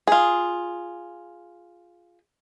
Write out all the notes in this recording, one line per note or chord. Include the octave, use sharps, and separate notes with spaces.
F4 G#4